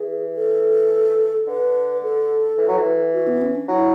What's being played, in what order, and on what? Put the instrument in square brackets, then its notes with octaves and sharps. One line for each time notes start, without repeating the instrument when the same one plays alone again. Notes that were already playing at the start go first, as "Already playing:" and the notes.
Already playing: [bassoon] E3 [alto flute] G#4
[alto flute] A4
[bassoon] D3 [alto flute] B4
[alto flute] A4
[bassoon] E3
F#3
E3
[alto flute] F#4
B3
C#4
D4
[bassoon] F#3 [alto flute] E4